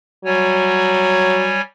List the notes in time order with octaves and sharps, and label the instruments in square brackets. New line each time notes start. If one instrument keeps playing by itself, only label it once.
[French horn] F#3 [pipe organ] G3 C#5 G#5